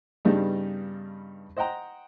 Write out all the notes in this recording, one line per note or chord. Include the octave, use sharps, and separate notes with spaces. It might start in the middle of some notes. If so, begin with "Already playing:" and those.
G2 C#3 G3 B3 D4 D#4
C5 D#5 F#5 G5 A#5